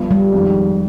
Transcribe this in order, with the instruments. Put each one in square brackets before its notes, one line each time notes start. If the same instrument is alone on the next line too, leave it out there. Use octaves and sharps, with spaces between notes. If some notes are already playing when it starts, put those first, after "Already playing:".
Already playing: [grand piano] G1 G2 F3
[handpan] G3
[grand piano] F2 D#3 G#3